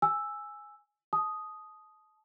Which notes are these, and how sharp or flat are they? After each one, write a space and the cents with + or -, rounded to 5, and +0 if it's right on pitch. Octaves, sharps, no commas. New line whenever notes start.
G#5 +0 E6 +0
A5 -30 D#6 +0